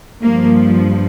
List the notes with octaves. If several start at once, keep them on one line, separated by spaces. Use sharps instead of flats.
G2 F3 A#3